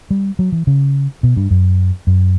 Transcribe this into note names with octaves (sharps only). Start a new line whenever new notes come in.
G3
F#3
E3
C#3
B2
G2
F#2
F#2